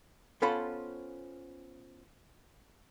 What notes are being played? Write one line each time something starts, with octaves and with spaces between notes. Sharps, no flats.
B3 C#4 F4 A4 C5 B5